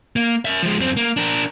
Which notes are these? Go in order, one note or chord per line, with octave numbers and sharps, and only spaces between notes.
A#3
A#4 E5
F3 G#3
F#2 C4
A#3
D4 A#4